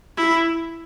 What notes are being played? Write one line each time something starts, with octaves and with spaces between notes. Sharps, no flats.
E4